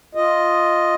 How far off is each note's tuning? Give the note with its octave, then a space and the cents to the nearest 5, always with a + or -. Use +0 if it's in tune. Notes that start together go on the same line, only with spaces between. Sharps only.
F4 +0 D#5 +0